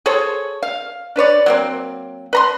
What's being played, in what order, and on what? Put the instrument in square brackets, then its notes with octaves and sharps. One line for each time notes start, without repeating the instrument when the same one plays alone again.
[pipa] G#4 A4 C5 C#5
F5
D4 B4 C#5 D5
F#3 A#3 C4
B4 A#5 C6